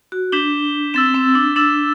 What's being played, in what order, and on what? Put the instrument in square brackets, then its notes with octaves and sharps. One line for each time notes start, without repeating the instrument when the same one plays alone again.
[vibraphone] F#4
[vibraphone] D4 [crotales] G6 B6 E7 G7
[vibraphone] C4 [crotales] E6 A6 E7
[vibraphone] C4
D4
[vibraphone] D4 [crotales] E6 A6 E7